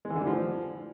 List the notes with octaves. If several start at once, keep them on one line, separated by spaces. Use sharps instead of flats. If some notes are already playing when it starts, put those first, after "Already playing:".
G#3
E3
D3
G3
F3